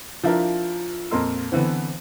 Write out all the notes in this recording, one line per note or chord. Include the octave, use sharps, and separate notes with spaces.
F3 D4 E4 F4 A#4
F2 A#2 A#4 D#5 C6 E6
D3 E3 B3 C4